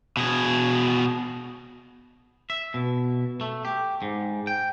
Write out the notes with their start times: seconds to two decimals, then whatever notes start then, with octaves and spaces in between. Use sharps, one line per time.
0.17 B2 G#4
2.50 E5
2.74 B2
3.41 A3
3.65 G4
4.02 G#2
4.47 G5